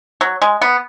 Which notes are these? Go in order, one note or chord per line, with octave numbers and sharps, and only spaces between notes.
F#3
G#3
B3